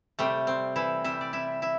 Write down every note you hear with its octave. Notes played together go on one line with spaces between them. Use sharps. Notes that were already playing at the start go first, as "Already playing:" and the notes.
C3 G3 A3
C4
E3 E4
C3 G3 E4 E5
D5
E4 E5
E4 E5